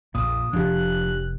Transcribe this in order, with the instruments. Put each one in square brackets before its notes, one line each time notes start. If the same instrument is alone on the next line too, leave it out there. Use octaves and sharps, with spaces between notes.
[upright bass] A#1 F2 [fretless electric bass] A#2 [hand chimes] D#6
[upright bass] F1 F2 [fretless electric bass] F3 [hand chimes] D4 G4 [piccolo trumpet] F#6